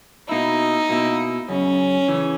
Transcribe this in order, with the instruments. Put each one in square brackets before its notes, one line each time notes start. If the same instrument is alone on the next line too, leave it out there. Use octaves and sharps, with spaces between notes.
[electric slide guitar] B2 A#3 E4 [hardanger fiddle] D#4
[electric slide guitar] B2 A#3 E4
[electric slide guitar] F#2 C#3 [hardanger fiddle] C#4
[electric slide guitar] C#3 E3